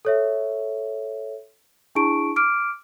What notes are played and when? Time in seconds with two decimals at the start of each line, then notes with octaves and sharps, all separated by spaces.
0.05 A4 C#5 E5
1.95 D4 E4 G#4 A5 C#6 D7
2.36 D6 F6 D7